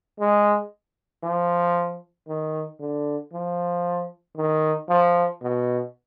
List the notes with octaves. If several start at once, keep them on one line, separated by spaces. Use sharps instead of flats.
G#3
F3
D#3
D3
F3
D#3
F3
B2